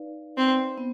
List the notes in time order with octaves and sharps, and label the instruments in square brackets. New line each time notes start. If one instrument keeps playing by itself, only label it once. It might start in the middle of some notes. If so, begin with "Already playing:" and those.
Already playing: [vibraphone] D#4 B4 D5 F5
[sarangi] C4
[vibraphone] B3